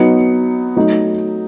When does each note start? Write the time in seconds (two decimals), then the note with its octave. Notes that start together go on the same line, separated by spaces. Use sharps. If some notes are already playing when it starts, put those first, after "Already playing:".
Already playing: F#3 B3 D#4 C#7
0.76 F#3 A3 D#4